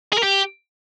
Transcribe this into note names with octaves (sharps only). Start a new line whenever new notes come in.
G#4
A#4
G4